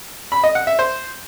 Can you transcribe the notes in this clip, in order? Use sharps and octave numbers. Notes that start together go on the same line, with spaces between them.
B5
D#5
F#5
E5
C5